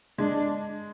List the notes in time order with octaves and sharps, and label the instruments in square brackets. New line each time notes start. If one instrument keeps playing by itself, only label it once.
[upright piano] G#3 [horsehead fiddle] D4